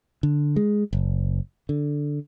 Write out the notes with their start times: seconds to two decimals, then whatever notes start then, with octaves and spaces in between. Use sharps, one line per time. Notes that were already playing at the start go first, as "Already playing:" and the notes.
0.23 D3
0.56 G#3
0.93 F#1
1.69 D3